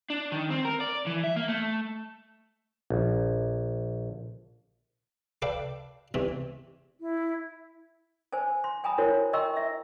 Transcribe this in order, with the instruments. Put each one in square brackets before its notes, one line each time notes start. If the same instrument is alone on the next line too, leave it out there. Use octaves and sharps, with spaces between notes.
[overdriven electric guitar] D4
D#3
C4
A#4
D5
E3
E5
A#3
A3
[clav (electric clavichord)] A#1
[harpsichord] A4 B4 D5 F5 G5
E2 G#2 C3 E3
[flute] E4
[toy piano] C5 G#5 A5
C6
G5 G#5 A#5 B5 D#6
E4 F#4 A#4 C5 C#5
D#5 G5 A#5 C6 C#6 E6
E5